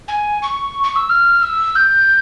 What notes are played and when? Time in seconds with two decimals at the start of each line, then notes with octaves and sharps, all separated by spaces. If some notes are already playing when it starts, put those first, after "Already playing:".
0.08 G#5
0.42 C#6
0.84 C#6
0.96 E6
1.10 F6
1.43 E6
1.76 G6